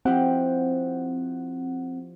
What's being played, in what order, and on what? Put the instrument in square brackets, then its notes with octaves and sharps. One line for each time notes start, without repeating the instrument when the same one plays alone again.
[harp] F3 E4 G4 [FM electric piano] C4 F#5